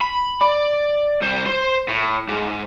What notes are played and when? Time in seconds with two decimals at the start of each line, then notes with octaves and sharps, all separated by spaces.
0.01 B5
0.41 D5
1.22 C2 C5
1.46 C5 C6
1.89 A2
2.29 G#2